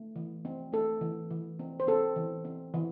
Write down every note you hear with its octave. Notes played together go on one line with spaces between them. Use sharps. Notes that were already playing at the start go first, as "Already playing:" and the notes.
Already playing: A3
E3
C4
A3 A4
E3
E3
C4
C5
C4 A4
E3
C4
E3